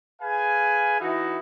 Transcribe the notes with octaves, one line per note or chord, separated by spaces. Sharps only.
G#4 B4 F5 G#5
E3 D#4 E4 F#4